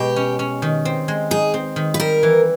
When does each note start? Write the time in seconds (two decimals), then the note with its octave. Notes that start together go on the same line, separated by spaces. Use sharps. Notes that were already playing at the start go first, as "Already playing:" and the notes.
Already playing: B2 G#3 G4
0.16 C#4
0.39 C#4
0.62 D#3
0.85 C4
1.08 G#3
1.31 D#4 G#4
1.54 C4
1.76 D#3
1.94 B4
2.00 G3 A#4
2.23 E3